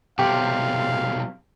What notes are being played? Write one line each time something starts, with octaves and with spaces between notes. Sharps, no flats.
B1 C3 G4 F5